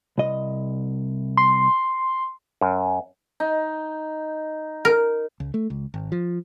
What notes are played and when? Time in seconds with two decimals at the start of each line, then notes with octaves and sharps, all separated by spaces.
0.18 C2 D#5
1.37 C6
2.61 F#2
3.40 D#4
4.85 A#4
5.40 C#2
5.54 A3
5.70 C#2
5.94 G#1
6.12 F3